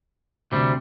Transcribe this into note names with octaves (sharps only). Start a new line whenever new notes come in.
D2 C3 G3